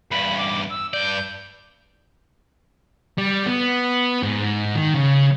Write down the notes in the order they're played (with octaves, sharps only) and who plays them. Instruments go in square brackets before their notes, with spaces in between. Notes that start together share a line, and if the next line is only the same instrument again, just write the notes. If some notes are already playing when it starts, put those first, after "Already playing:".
[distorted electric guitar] E2 G2 [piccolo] B5
[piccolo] D6
E6
[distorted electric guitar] G2 D5 [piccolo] G6
[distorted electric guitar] G3
B3
G#2
D#3
C#3